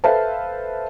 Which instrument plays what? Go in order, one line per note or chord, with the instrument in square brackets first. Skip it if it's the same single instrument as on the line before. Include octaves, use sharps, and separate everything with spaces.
[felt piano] A4 B4 C5 E5 F5 A5